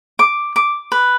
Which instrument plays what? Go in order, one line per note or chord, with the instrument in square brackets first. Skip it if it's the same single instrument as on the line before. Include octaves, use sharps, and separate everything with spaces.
[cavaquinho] D6
D6
B4